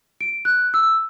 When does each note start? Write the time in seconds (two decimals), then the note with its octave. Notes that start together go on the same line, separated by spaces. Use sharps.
0.21 D7
0.45 F#6
0.74 E6